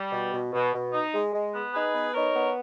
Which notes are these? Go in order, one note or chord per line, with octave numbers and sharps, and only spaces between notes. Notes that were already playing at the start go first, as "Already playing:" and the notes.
Already playing: G3
B2
B2
B2
B2
D#4
G#3
G#3
B3
D#4 G#4 B4
B3
D#4 A#4 C#5
B3